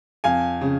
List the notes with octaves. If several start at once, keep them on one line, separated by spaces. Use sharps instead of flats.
F2 F5 G#5
C#3